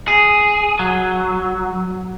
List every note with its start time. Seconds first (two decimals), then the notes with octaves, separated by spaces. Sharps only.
0.08 G#4
0.79 F#3